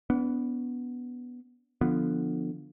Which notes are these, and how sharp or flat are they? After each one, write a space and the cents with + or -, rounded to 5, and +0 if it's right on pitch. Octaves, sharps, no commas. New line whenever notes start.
B3 +0 D4 -40
D3 +10 F3 +0 B3 +0